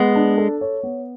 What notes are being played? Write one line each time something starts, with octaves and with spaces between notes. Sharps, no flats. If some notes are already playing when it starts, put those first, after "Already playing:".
Already playing: G#3 B3
D4
A4
C#5
B3